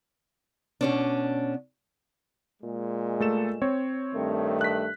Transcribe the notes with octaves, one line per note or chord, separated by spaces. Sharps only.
B2 C#4 D4
A#2 G#3
A3 A4 E7
C4 C#5
G2 D#3 A3
F#6 B6